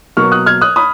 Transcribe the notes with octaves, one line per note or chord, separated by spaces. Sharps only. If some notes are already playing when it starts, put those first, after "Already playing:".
B2 F#3 A#3 C#6 F6
D#6 F#6
F6 G#6
D#6 F#6
B5 D#6